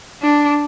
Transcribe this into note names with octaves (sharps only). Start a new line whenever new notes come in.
D4